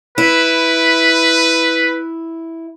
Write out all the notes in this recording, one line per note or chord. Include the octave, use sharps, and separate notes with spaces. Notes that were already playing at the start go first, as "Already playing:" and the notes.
E4 B4